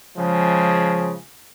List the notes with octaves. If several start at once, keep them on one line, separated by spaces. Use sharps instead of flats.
C#3 F3 G#3